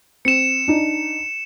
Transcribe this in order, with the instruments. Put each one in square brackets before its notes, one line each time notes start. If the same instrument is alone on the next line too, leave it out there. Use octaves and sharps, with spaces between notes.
[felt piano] C4 [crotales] C#7 E7
[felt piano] D4 D#4